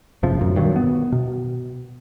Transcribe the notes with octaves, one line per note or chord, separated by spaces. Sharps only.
F#1 G#2 C3 F3
D1 F#2
G2 B2 D#3 F#3
B3
B2